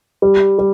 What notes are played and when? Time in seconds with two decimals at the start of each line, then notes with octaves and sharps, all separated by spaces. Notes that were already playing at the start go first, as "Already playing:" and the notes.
0.22 G3
0.59 G3